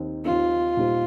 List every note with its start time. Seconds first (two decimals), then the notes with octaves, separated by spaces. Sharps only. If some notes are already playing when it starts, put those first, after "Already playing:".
Already playing: D#2 D#3 C4 D#4
0.25 D#2 D#3 C4 D#4 F4
0.77 A#2 G3 D#4 G4 C5